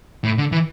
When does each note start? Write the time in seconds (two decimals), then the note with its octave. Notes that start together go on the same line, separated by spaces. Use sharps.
0.25 A2
0.38 D3
0.52 E3